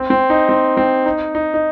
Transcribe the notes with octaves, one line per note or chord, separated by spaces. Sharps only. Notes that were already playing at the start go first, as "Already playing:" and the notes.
Already playing: C4
C4
D#4
C4
C4
D#4
D#4
D#4